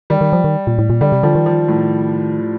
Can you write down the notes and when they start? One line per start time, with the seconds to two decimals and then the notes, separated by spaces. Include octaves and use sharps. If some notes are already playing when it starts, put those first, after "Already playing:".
0.10 D#3 G3
0.21 D#3
0.33 F3
0.44 D#3
0.67 A#2
0.78 A2
0.90 A#2
1.01 D3 G3
1.12 C3
1.23 D3 F3
1.35 D#3
1.46 F3
1.68 A2